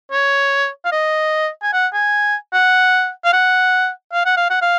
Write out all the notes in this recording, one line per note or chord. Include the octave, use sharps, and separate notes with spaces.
C#5
F5
D#5
G#5
F#5
G#5
F#5
F5
F#5
F5
F#5
F5
F#5
F5